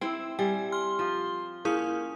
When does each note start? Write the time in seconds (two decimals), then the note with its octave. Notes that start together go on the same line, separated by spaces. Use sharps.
0.01 C4 E4 G5
0.39 G3 G5 G#5
0.72 C6 F6
0.99 F3
1.65 A#3 C#4 E4 G#4 D#6